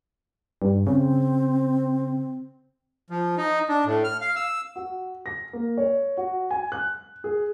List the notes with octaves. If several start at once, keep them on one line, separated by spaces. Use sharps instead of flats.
G2
C#3 C4
F3
D#4
D4
A2
F6
F5
E6
F#4
A#6
A#3
C#5
F#4
G#5
F#6
G#4